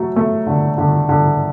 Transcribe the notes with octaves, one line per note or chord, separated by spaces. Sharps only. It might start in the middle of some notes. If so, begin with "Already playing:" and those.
Already playing: F#3 A3
A3
D3
D3
D3